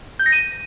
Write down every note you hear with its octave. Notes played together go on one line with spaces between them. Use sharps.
G6
A#6
D#7